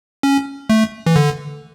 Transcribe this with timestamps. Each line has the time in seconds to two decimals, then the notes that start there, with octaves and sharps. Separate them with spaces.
0.23 C#4
0.70 A3
1.06 E3
1.16 D3